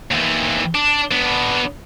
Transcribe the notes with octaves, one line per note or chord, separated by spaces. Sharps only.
D#2 E3
D4
B3 D4